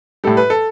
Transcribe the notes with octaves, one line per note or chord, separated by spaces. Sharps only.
A2 G3 A4
B4
A4